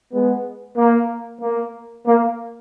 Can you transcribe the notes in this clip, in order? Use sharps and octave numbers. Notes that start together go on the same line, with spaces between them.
G#3 B3
A#3
A#3
A#3